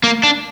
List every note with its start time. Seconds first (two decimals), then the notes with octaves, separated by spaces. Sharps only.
0.04 A#3
0.23 D4